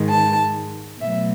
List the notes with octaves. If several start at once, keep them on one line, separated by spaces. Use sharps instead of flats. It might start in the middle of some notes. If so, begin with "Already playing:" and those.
Already playing: G#2 D#3 G#3
A5
B2 F#3 A3 E5